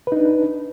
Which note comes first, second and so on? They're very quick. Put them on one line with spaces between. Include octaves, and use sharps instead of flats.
B4 D#4 D4